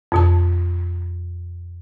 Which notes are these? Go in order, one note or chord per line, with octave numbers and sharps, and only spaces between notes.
F2 B2 A5